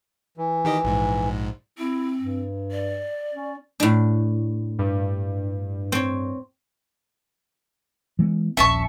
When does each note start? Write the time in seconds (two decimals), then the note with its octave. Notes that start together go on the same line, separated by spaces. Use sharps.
0.37 E3
0.65 D#3 G4 D#5
0.84 A#1 G#2
1.78 C4 E4
2.20 G2
2.72 D5
3.34 C#4
3.80 A2 D4
4.79 G2
5.92 C4 C#5
8.19 E3 G#3 B3
8.57 D#1 A#1 C#4 E5 A5 C#6